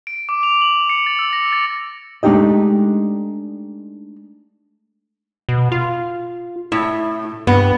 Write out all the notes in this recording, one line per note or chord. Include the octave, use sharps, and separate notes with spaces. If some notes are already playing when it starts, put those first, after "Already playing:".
D7
D6
F7
F#7
C#7
A6
E6
A#6
A6
G#3 A3 D4 D#4 G4 D#5
B2
F4
A2 E4
G2 B3